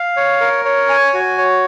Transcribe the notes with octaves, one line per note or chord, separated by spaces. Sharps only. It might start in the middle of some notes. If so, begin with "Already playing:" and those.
Already playing: F5
C#5
A#4
C#5
G#5
F#4
C#5